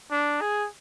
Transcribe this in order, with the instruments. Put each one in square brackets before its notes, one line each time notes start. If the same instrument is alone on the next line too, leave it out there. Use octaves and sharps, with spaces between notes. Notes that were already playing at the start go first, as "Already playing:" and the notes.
[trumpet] D4
G#4